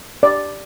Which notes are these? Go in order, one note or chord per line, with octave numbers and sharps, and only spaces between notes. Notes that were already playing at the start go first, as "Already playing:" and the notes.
D5